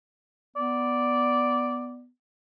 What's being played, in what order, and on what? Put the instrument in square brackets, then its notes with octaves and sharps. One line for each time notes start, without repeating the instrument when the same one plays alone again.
[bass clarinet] B3 [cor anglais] D5